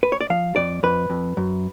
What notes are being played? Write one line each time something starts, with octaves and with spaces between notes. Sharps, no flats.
B4
C#5
D5
F3 F5
F2 D5
F2 B4
F2
F#2